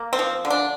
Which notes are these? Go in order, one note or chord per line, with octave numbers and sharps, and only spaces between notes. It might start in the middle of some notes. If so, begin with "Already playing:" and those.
Already playing: A#3
C4
F3
D3
D4